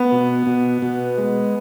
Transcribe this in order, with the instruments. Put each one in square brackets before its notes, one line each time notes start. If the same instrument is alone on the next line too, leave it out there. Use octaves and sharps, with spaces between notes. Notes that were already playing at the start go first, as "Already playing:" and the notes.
Already playing: [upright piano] B3
[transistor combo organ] B2
B2
B2
G#3